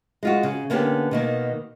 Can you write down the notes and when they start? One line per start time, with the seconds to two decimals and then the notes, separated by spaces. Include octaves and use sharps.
0.23 G#3 F4 F#4
0.43 C#3
0.70 D3 A#3 B3 C#4 D4 G4
1.11 B2 D#3 A#3